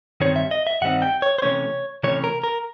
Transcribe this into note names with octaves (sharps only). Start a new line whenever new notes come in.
G2 D#3 G3 C4 D#4 C#5
E5
D#5
E5
G2 D#3 G3 C4 D#4 F#5
G5
C#5
C5
C3 E3 A3 C#4 C#5
C3 E3 A3 C#4 C#5
A#4
A#4